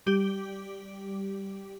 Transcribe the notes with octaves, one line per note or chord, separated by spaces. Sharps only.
G3 G4